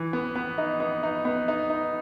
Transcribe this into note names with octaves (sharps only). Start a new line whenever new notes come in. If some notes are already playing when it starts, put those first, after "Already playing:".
Already playing: E3
B3
B3
D#4
B3
D#4
B3
D#4
D#4